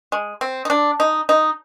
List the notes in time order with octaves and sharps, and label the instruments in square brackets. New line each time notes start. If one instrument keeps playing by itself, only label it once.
[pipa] G#3
C4
D#4
D4
D#4
D#4